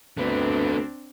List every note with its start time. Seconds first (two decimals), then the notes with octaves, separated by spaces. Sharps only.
0.17 D2 D3 B3 C4 D4